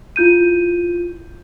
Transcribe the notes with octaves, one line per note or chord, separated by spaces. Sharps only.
E4 F4 G6 D#7